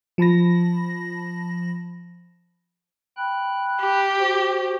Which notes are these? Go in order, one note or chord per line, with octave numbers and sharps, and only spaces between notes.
F3 A5 B5 A#6
G5 B5 F#6
G4
F#4 C5